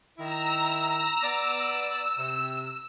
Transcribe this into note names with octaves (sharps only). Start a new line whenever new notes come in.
D#3 E4 A#5 E6 A#6
B3 D5 E6
C3